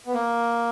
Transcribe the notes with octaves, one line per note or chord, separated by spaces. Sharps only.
B3
A#3